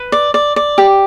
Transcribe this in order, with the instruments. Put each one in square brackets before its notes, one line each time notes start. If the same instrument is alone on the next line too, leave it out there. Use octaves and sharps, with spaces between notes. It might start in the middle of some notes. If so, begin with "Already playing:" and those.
Already playing: [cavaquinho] B4
D5
D5
D5
G4